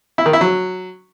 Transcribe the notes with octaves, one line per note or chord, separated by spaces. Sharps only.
E4
D#3
E4
F#3